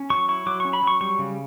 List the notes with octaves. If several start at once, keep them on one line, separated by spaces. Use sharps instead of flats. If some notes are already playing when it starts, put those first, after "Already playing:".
Already playing: C#4
F#3 C#6
E4 C#6
F#3 D6
C#4 C#6
B5
F#3 C#6
G3 C#6
C#3